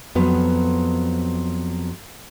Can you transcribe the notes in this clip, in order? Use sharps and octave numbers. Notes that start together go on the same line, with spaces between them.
F2 F#3 B3